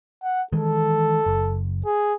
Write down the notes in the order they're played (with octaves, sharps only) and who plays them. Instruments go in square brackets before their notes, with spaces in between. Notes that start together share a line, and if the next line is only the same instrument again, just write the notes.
[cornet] F#5
[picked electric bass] D#3 E3 G#3 [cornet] A4
[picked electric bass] F#1
[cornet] G#4